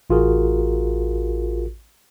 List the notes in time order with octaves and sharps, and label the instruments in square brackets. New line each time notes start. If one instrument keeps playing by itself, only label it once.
[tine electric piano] A1 F4 F#4 G#4 A#4